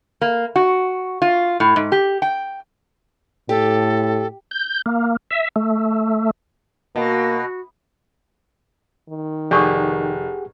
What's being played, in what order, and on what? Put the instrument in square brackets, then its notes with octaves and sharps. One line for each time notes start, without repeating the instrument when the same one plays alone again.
[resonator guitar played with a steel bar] A#3
F#4
F4
A2
G#2
G4
G5
[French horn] A2 [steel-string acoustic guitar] G4 [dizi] A4
[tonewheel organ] G6
A#3
E5
A3
[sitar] B2 [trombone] A#3 [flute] F#4
[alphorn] D#3
[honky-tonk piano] F1 [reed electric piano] G4 G#4 F#5 [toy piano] D5 C#6 D#6